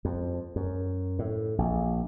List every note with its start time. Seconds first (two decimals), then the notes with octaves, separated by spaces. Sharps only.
0.05 F2
0.56 F#2
1.19 A2
1.58 A#1